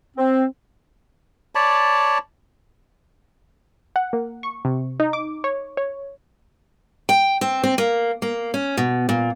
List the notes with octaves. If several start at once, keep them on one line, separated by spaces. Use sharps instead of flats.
C4
C#5 D5 A5 B5
F#5
A#3
C#6
C3
D#4
D6
C#5
C#5
G5
C4
C4
A#3
A#3
C#4
B2
A#2